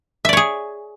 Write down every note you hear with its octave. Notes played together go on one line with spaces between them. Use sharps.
G#4 C#5 D5 E5